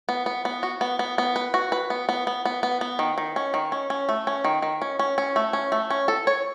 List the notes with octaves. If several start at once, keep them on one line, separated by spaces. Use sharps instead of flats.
B3
B3
B3
F#4
B3
B3
B3
B4
F#4
B4
B3
B3
B3
B3
B3
B3
D#3
D#3
C#4
D#3
C#4
C#4
A3
C#4
D#3
D#3
C#4
C#4
C#4
A3
C#4
A3
C#4
A4
C#5